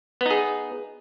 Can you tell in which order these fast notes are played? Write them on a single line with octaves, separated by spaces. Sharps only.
B3 D#4 G#4